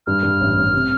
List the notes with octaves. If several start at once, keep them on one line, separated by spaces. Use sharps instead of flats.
G2 F6
G2
A1
A1
C3